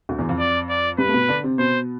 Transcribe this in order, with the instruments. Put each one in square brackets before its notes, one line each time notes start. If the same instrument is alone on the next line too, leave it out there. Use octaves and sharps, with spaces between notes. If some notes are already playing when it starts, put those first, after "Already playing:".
[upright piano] D2 D3
E2 E3
F2 F3
[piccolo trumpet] D5
D5
[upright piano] G2 G3 [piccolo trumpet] B4
[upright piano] A3
B2 B3
D3 D4
C3 C4
[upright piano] B2 B3 [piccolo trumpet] C5